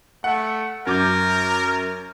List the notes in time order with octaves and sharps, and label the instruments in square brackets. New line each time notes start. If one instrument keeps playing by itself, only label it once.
[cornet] A3 [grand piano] F#5
[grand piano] F#2 D6 G6 [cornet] A#4